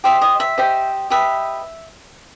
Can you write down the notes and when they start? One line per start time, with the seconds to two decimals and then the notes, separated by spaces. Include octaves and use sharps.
0.04 G4 C5 D#5 E5
0.21 D#5
0.40 E5
0.58 G4 C5 D#5
1.10 G4 B4 D#5 E5